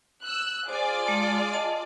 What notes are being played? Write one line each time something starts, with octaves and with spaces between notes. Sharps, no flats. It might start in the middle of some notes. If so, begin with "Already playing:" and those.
E6 F#6
F4 G#4 C5 D5 G#5
G#3 A5
D#5 A5